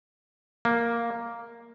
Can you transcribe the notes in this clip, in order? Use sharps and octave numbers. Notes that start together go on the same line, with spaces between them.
A#3